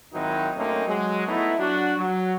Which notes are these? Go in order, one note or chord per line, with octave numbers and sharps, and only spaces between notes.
G#1 D#3 F#3 C4 D#4 E4
F#2 A3 A#3 C4 C#4 D#4
F#3 G#3
A3 B3 D#4 E4
F#3 D4 F#4
F#3